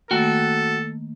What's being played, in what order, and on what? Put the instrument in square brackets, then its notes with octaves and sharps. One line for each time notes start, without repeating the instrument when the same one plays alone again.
[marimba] D#3 A3 A#3 [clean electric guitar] F#4 G5 [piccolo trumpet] A4